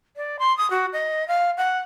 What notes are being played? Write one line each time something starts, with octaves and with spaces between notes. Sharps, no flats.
D5
C6
D#6
F#4
D#5
F5
F#5